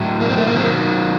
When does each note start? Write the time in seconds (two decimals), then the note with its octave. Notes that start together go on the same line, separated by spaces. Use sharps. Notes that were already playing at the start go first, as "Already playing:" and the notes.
Already playing: A2 F#3
0.20 A#3
0.29 C4
0.37 A3
0.47 A#3
0.56 D#3 F#3 C4